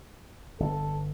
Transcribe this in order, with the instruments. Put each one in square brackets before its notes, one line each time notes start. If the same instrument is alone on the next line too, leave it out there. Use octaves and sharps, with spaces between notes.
[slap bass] G1 [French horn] A4